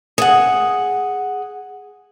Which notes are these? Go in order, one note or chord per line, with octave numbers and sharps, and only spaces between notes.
G#4 F#5